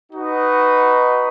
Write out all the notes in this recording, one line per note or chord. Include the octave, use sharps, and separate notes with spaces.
D#4 F#4 B4 D#5